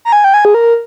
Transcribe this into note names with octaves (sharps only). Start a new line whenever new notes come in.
A#5
G#5
G5
G#5
G#4
A#4